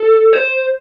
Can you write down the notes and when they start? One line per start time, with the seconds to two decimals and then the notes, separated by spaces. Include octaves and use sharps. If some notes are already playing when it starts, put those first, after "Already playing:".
Already playing: A4
0.33 C5